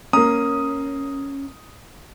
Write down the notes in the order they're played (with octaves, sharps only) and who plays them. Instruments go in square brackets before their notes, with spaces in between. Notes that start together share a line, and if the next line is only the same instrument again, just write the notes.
[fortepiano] A#3 A#5 [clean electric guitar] C#4 [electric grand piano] D#6